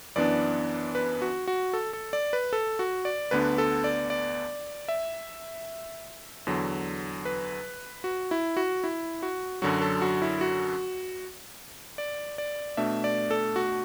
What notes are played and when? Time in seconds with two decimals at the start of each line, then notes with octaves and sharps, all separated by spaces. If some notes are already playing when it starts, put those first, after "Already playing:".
0.16 F#2 E3 B3 D4 D5
0.95 B4
1.22 F#4
1.47 F#4
1.73 A4
1.93 A4
2.13 D5
2.33 B4
2.53 A4
2.79 F#4
3.05 D5
3.31 D2 D3 B3 D4 B4
3.58 A4
3.84 D5
4.10 D5
4.88 E5
6.47 E2 D3 F#3
7.25 B4
8.04 F#4
8.31 E4
8.57 F#4
8.84 E4
9.23 F#4
9.62 F#2 D3 F#3 F#4
9.82 A4
10.02 F#4
10.22 E4
10.41 F#4
11.98 D5
12.38 D5
12.77 B2 A3 D4 E5
13.04 D5
13.31 A4
13.56 F#4